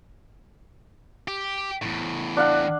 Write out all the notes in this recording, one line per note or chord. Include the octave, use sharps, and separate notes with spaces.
G4
E2 A2
D4 F5 F#5